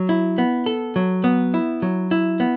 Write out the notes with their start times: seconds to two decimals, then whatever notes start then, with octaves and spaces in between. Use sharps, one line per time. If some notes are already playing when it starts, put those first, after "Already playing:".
Already playing: F#3
0.09 E4
0.38 B3
0.66 A4
0.96 F#3
1.24 B3
1.54 E4
1.82 F#3
2.11 E4
2.40 B3